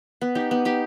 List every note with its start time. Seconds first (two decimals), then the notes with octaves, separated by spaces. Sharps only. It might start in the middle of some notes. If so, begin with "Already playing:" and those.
0.21 B3
0.35 D#4 G4
0.51 B3
0.65 D#4 G4